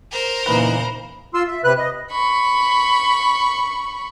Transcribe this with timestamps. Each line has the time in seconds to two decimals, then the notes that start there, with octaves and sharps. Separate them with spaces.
0.11 A#4 C5
0.47 E2 A#2 C#3 E3 D#4 B4 B5
1.34 F4 C6 E6
1.48 E5
1.64 C3 B4 F#6
1.78 D#5
2.11 B5 C#6